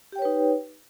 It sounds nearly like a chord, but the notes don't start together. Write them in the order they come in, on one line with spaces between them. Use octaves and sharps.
G4 G5 C#5 B4 D#4